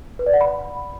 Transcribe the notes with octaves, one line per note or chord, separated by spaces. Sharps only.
B4
D5
F#5
B5